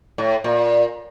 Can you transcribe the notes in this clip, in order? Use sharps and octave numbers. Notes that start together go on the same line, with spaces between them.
A2
A#2